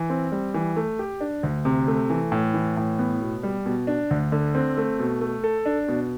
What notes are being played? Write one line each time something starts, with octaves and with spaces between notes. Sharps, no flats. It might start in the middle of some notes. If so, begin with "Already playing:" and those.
Already playing: E3
C4
G3
E3
A3
G4
D4
D2
C3
A3
E3
A2
E3
A2
B3
B2
G3
B2
D4
D2
D3
C4
A3
B2
A3
A4
D4
B2